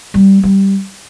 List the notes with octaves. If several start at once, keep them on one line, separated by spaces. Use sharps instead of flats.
G3
G3